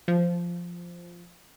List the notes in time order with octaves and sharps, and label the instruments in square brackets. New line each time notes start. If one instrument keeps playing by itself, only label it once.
[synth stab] F3